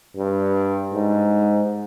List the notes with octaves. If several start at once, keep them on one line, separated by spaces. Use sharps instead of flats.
G2
G#2